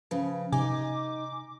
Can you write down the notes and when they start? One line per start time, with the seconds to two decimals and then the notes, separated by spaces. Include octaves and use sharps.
0.11 C#3 F3 B4
0.53 C3 D#4 G#5 D6